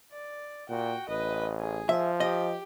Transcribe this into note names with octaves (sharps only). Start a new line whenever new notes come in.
D5
A#2 F#4 G5
A1 B4 D#5
G#4
F3 E5
G4 D#5